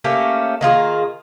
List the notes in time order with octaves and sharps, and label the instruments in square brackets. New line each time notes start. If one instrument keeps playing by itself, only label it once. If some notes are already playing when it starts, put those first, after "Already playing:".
[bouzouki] A3 A#3 C#4 G4
D#3 A#3 F4 G#4